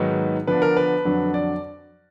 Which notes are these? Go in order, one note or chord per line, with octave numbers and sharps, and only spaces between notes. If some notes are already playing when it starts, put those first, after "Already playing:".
Already playing: G#2 D#3 F#3 B3 D#4 B4
D3 F3 B3 D4 B4
A#4
B4
F2 D3 F#3 D4
D5